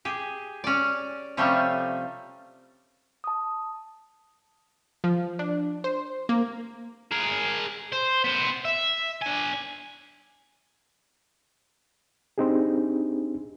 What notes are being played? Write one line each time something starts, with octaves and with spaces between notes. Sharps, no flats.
G4 G#4
C#4 D5
C3 F3 G3 A3 C#4
A5 D#6
F3
D4
C5
A#3
G#4 A#4
C5
B3 C5
E5
D4 G#5
C4 D4 D#4 G4 G#4